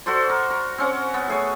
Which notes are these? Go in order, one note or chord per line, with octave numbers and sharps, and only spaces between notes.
F#4 A4 C5 D5
A#4
A#4
C4 C#4 F#5
B3
A3 G#4 C#5